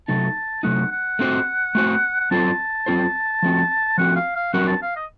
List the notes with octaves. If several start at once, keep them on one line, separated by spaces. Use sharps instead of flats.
C3 F#3 A3 D#4 A5
C3 F#3 A3 D#4 F#5
F#5
A3 C4 F#4 C5
A3 C4 F#4 C5
F#5
F#3 C4 F4 A4 C5 A5
F#3 C4 F4 A4 C5
F3 A3 C4 F#4
F3 A3 C4 F#4 F#5
F5
F5
F#3 C4 F#4 A#4 F#5
A5
F5
D#5